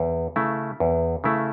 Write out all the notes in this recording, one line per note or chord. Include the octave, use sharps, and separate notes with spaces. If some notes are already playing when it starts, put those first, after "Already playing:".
Already playing: E2
C#3 A3 E4
E2
C#3 A3 E4